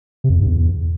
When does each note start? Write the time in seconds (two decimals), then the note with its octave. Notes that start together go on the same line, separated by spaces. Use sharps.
0.24 C3
0.30 F2
0.35 E2
0.41 G2
0.47 E2